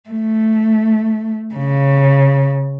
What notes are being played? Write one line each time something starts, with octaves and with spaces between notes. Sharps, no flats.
A3
C#3